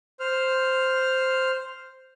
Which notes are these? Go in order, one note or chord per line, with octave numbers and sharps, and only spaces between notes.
C5 F6